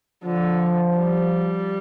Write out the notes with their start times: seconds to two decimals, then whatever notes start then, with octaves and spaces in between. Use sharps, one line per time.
0.24 D3 F3
0.97 G3